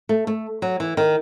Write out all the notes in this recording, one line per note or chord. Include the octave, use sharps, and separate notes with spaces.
A3
A3
F#3
E3
D#3